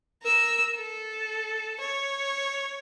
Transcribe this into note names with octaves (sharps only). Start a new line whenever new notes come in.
A#4 E6
A4
C#5